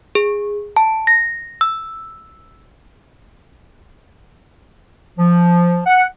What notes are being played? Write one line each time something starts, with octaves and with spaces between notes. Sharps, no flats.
G#4
A5
A#6
E6
F3
F#5